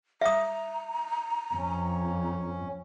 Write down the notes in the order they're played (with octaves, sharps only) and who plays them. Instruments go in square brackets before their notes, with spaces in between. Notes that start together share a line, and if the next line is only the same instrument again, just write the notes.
[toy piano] E5 D#6 [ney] A#5
[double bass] F2 [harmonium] C#4